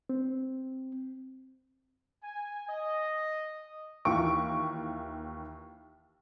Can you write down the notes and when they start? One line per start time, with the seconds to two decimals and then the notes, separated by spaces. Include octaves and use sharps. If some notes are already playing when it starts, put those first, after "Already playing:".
0.09 C4
2.22 G#5
2.68 D#5
4.05 D#2 E3 E4 F4 C#6 D7